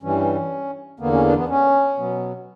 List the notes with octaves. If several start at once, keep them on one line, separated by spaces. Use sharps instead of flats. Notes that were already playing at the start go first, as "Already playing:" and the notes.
G2 E3 G3 C#4
E2 D3 A#3 B3
C#4
B3 D4
B3
C#4
B2 F#3 B3